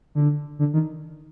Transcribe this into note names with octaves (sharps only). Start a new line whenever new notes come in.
D3
D3
D#3